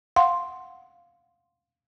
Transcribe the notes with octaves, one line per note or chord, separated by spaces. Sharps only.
F5 F#5 C6